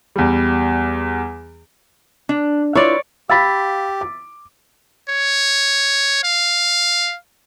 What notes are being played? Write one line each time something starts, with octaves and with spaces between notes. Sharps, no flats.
E2 G3
D4
E4 F4 B4 C#5 D5
G4 F5 B5 E6 A6 B6
D6
C#5
F5